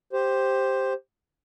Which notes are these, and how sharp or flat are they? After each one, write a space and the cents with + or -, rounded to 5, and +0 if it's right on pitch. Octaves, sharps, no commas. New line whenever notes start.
G4 +0 C5 +5